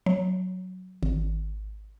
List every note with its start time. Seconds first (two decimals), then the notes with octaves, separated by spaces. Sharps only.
0.06 F#3
1.03 G#1